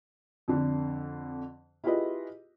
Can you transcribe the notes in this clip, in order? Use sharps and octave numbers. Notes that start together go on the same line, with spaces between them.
F2 D3
E4 F4 G4 G#4 B4 D#5